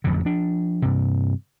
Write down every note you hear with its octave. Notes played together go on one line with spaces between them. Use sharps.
A1 F2 D3
F3 D4
G2 C3